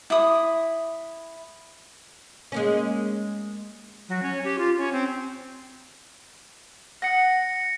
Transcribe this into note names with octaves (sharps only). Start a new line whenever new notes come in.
E4 D#6
G#3 A#3 C#4
F#3
C#4
G4
F4
C#4
C4
F#5 D#6 A#6 C#7